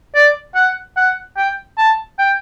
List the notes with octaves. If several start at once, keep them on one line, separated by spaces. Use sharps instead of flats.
D5
F#5
F#5
G5
A5
G5